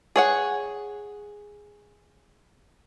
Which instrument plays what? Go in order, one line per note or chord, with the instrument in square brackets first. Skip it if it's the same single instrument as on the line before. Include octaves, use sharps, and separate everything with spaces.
[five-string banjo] G#4 C#5 F#5